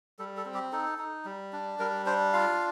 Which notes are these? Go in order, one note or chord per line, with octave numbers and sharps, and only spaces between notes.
G3 A4
A4
C4
G4
D#4 A4
D#4
G3
D4
G3 A#4
D4 C5
F4 F5